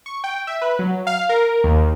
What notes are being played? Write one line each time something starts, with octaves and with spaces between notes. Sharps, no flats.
C#6
G5
E5
B4
F#3
F5
A#4
D#2